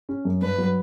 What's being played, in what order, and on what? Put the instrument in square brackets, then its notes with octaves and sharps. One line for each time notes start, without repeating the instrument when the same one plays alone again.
[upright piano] C#4
F#2
[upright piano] G2 [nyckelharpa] B4
[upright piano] F#3